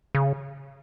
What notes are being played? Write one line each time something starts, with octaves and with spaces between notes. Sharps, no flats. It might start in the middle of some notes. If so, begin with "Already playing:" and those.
C#3